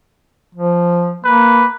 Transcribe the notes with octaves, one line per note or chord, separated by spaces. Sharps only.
F3
A#3 B4